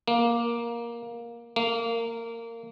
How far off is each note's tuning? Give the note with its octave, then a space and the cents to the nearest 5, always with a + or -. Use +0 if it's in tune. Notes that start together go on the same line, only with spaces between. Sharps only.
A#3 +10
A#3 -20